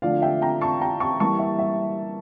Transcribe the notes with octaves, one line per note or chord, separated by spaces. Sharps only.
D3 F3 A3 D5 F5
E5 G5
G5 A#5
A5 C#6
G5 A#5
A5 C#6
E3 G3 A#3 A5 C#6
E5
E5